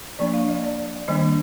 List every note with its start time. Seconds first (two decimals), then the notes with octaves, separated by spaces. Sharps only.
0.19 F3 A#3 D4 D5
0.34 F5
0.48 D#5
0.63 D5
1.08 D#3 G3 A#3 D4 D#5